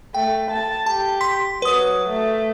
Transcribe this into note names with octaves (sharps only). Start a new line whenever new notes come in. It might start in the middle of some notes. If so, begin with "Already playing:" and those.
A3 G5
A5
G4 A5
C6 B6
F#3 B4 D#6
A3